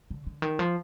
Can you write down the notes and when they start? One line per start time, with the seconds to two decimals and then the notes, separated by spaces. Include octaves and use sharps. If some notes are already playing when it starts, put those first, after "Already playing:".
0.10 D3
0.27 D3
0.42 D#3
0.59 F3